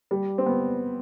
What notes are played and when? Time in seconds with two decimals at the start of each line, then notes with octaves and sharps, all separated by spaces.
0.11 G3
0.38 C4
0.46 B3